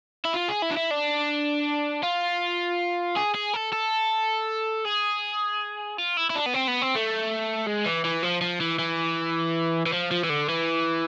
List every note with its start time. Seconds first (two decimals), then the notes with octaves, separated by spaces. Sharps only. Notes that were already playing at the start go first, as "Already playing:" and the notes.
0.25 E4
0.34 F4
0.48 G#4
0.62 E4
0.71 D4
0.77 E4
0.91 D4
2.04 F4
3.16 G#4
3.34 G#4
3.53 A4
3.72 A4
4.85 G#4
5.98 F4
6.17 E4
6.30 E4
6.36 D4
6.46 B3
6.54 C4
6.68 B3
6.82 C4
6.96 A3
7.67 G#3
7.86 E3
8.04 E3
8.23 F3
8.41 F3
8.61 E3
8.79 E3
9.86 E3
9.93 F3
10.11 F3
10.24 E3
10.29 D3
10.49 E3